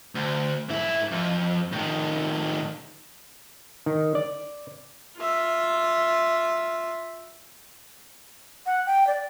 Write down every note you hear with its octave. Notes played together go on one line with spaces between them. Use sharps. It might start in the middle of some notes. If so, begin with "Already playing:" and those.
D2
G#2 E4
F2
A2 D#3
D#3
D5
F4 E5
F#5
G5
D5